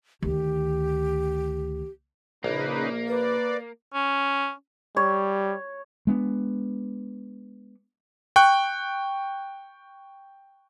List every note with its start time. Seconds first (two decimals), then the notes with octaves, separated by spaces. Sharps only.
0.22 D2 D#3 G4
2.44 A#1 C#3 A#3 D#4 B4
3.08 B4 D5
3.94 C#4
4.97 G3 C#5
6.07 G#3 B3 D4
8.36 G5 C#6 F#6